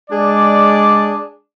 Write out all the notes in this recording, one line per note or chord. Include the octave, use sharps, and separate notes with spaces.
G#3 D4 G#4 D5